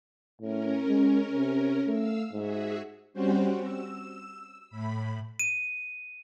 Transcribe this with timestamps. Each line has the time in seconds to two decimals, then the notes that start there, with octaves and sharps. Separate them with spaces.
0.41 A2 C#4 A#4
0.88 G#3
1.30 C3
1.87 A3 F5 E6
2.32 G#2 F#4 G#4 E5
3.13 G3 C4 C#4 F#4 C5
3.61 E6
4.70 A2 B5
5.39 D#7